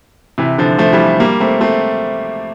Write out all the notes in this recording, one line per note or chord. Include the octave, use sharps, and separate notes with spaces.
C3 E3
D3 F3
F3 A3
E3 G3
G3 A#3
A3 C4
A3 C4